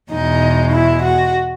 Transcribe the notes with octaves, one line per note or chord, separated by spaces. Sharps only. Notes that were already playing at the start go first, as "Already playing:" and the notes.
E2 B2 G#3 D#4
E4
F#4